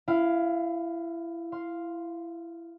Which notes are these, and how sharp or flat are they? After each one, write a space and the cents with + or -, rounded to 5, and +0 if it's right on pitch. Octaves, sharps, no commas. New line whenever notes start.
E4 +25 F5 +0
F5 +0 C6 +0